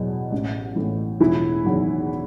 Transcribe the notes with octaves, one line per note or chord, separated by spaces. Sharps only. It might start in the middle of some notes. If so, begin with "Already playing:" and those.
Already playing: E2 B2 F#3
A1
A2 E3
E1 E3 E4
E2 D#3 F#3